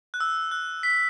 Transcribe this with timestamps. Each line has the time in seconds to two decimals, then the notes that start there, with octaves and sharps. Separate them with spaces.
0.14 F#6
0.20 E6
0.51 F#6
0.83 B6